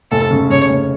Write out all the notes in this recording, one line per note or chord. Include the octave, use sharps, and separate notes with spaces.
F1 A4
C#3
C#3 C#5
F1